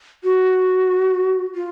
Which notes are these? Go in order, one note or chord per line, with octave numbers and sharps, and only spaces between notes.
F#4
F4